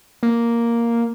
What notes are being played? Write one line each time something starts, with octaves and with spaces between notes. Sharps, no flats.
A#3